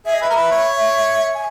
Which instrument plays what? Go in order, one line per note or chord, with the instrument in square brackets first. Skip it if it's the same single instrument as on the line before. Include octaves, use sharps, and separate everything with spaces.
[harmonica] G#4 [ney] E5
[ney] D#5
[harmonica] B4 [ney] E5
[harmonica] A#4
B4
C#5
[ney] G#5